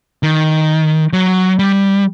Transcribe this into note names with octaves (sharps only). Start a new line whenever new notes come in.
D#3
F#3
G3